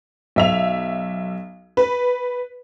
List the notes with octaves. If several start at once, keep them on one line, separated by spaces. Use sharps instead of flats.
B1 E5 F7
B4